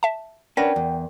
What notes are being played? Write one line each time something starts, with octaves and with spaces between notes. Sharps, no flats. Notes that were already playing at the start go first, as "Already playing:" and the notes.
E5 A5
C#4 D4 A#4 B4 D5 F#5 G5 A#6
E2